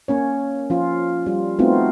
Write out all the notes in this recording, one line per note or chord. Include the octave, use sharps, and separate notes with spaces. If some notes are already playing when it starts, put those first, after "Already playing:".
A#3 C#4 C#5
F3 C#4 F4
G3 F4
A3 B3 C4 D#4 F4 F#4